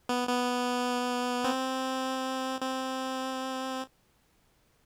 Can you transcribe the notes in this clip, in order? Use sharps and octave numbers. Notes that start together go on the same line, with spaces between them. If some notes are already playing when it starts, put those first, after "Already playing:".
B3
B3
C4
C4